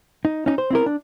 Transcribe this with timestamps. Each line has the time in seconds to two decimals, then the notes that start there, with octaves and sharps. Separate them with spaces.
0.25 D#4
0.46 C#4 D#4
0.58 C5
0.71 C4 E4 A#4
0.86 D4